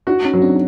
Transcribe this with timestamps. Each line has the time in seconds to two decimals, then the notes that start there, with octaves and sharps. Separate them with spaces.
0.07 D4 E4 F#4
0.24 C#4 D#4
0.33 F#3
0.42 C4 D4